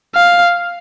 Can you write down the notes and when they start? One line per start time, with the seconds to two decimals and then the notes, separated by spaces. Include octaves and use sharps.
0.15 F5